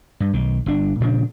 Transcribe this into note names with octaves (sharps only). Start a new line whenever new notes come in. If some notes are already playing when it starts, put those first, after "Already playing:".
G2
B1 D#3
G1 D4
A#2 C#3 F3 D4